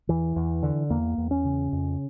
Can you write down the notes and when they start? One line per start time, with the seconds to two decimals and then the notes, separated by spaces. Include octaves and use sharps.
0.09 E2 E3
0.36 E2
0.63 D3
0.90 E2 A#3
1.18 E2
1.31 C#4
1.45 C#3
1.72 F2